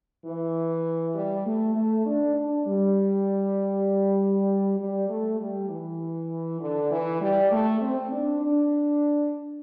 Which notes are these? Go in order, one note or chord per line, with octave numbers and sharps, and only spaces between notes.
E3
G3
A3
A3
D4
D4
G3
G3
A3
G3
E3
D3
E3
G3
A3
C4
D4
D4